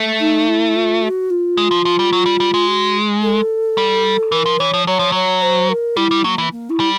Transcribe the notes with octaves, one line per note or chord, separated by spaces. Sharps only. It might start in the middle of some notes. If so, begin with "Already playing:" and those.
Already playing: A3
D#4
E4
F4
F#4
F4
G#3
F3
F3
G3
F#3
G3
G3
G#3
F#4
A4
G3
E3 A#4
F3
E3 C#5
F3
F#3 C#5
F3
F#3 C#5
C5
A#4
G3 E4
G3
F#3 A#3
E3
A#3
E4
G3